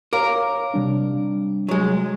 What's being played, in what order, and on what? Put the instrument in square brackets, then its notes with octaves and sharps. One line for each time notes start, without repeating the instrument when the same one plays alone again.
[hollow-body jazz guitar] A#4 [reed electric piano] C#5 F5 D6
[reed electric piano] C3 G3 D4
[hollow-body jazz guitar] F#3 G#3